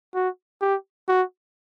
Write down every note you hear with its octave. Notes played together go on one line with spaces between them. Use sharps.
F#4
G4
F#4